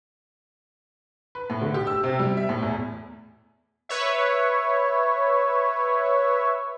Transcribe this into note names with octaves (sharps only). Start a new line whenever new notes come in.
B4
A2
D3
G4
E6
C3
G3
E5
A2
E2
B4 C#5 E5